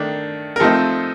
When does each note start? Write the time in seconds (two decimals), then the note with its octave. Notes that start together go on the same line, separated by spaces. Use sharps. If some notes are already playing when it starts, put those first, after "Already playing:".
Already playing: D#3 A3 D4
0.56 A#4
0.60 F3 A3 C4 D#4 A4